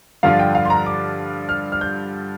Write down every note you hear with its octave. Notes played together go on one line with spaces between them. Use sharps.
G2 D3 F3 D4 F4 F5
G5
F5
C6
A#5
D6
F6
F6
G6